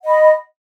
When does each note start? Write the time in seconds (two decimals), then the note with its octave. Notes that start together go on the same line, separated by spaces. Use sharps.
0.01 F#5
0.04 D#5
0.07 B5